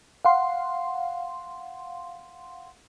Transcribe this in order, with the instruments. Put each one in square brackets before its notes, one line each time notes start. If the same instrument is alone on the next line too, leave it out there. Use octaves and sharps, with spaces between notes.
[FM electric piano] F5 F#5 C6